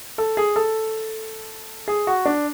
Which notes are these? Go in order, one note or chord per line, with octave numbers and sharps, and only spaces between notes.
A4
G#4
A4
G#4
F#4
D4